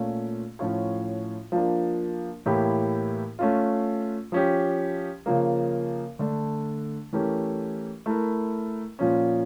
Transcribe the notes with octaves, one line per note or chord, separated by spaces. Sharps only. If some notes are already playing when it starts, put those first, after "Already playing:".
Already playing: A#2 A3 C#4 F4
A2 F3 C#4 F4 C#5
F3 A#3 D4
A2 E3 A#3 E4 G4
A3 C#4 F4
F3 C#4 G4
C#3 F3 A#3
D3 A3 D4
E3 A3 C#4 G4 A#4
A3 E4 A#4
A#2 F3 C#4